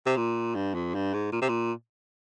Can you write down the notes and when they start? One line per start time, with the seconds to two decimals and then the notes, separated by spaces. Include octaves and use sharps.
0.06 C3
0.17 A#2
0.55 G2
0.75 F2
0.95 G2
1.14 G#2
1.32 A#2
1.42 C3
1.49 A#2